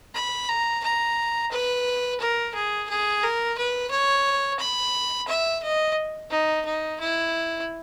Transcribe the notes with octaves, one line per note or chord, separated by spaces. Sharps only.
B5
A#5
A#5
B4
A#4
G#4
G#4
A#4
B4
C#5
B5
E5
D#5
D#4
D#4
E4